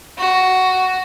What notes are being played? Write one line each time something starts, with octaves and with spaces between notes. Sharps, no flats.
F#4